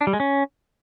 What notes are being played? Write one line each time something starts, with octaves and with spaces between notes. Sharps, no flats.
D4
G3
G#3
C#4